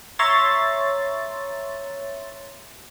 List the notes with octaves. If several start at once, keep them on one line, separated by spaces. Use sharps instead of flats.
C#5 E5 A#5 C6 A6